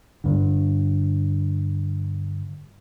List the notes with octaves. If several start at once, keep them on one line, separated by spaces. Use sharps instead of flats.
G2 D3